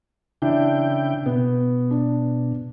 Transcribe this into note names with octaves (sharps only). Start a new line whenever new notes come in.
C#3 E3 D4 E4 G5
B2 B3
D4